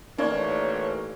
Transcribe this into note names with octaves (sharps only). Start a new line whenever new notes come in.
A1 A#3 D#4 C#5 D5 C#6